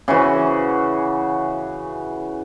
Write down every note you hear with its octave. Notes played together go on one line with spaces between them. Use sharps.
C#3 E3 F#4